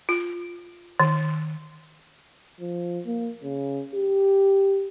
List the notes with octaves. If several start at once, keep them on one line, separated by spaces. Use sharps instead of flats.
F4
D#3
F3
A#3
C#3
G4